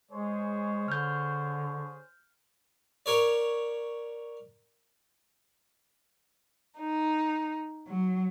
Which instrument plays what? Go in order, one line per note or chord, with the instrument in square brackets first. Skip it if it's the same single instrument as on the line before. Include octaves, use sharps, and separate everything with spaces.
[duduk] G#3 [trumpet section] G#4 C5 C#5
[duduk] D3 [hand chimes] F6 G6
[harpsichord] A#4 C#5 D5
[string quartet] D#4
F#3